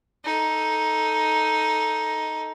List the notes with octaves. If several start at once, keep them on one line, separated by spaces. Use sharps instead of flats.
D#4 A4